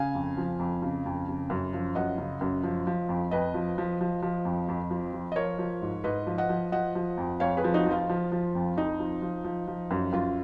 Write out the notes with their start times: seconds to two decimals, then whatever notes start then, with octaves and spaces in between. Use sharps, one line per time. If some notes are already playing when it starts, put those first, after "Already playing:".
Already playing: C#3 F5 G#5
0.15 F2
0.37 F3
0.59 F2
0.82 C#3
1.06 F2
1.28 C#3
1.50 F#2
1.73 F3
1.95 F#2 D#5 F#5
2.18 C#3
2.41 F#2
2.63 F3
2.87 F3
3.09 F2
3.31 F2 B4 D#5
3.54 F3
3.78 F3
4.01 F3
4.22 F3
4.45 F2
4.68 F2
4.90 F3
5.13 F3
5.32 D#5
5.36 F3 A#4 C#5
5.58 F3
5.82 G#2
6.04 G#2 B4 D#5
6.27 F3
6.38 D#5 F#5
6.49 F3
6.72 F3 D#5 F#5
6.95 F3
7.17 F2
7.40 F2 C#5 F5
7.57 G#4 B4
7.64 F3
7.74 D#4 F#4
7.86 F3 F4
8.09 F3
8.32 F3
8.55 F2
8.76 F2 D#4
8.99 F3
9.22 F3
9.44 F3
9.67 F3
9.91 F#2
10.13 F#2 F4